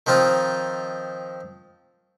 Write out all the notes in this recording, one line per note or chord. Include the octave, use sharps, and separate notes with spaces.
D#3 F3 C4 D#4 F4